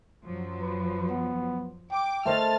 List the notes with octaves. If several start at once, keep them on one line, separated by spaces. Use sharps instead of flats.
F#2 F3 F#3
B4
B3
G5 D6
A3 C5 D#5 F6 A6